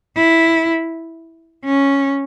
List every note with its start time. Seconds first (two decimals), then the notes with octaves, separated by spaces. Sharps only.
0.17 E4
1.65 C#4